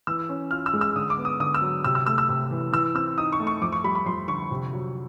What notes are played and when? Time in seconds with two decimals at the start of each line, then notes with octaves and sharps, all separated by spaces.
0.07 E3 E6
0.29 C#4
0.51 F4 F6
0.66 E6
0.74 G#3
0.81 E6
0.96 D3 D#6
1.10 D6
1.18 B3
1.25 D#6
1.40 D3 D#6
1.54 E6
1.61 F#3
1.84 C3 E6
1.95 E6
2.06 A3 E6
2.18 E6
2.29 C3
2.51 E3
2.72 E3 E6
2.95 C4 E6
3.18 D#4 D#6
3.32 C#6
3.40 A3
3.47 C#6
3.62 F2 D6
3.72 C#6
3.84 G3 B5
3.95 B5
4.06 F2 C6
4.28 D3 C#6
4.51 C3
4.73 F#3